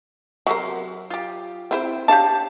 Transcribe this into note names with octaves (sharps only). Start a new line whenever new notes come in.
C3 F#3 D4 A#4 C6
F4 G4
C4 E4 C5
D4 G4 C#5 F5 A5